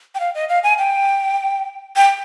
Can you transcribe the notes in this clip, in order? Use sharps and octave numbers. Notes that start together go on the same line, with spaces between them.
G5
F5
D#5
F5
G#5
G5
G5